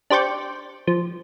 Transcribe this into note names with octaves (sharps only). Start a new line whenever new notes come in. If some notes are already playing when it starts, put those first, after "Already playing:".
D4 G4 C5 D5 G5 C#6
F3